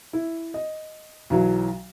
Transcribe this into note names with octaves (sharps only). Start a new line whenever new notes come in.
E4
D#5
B1 E3 F#3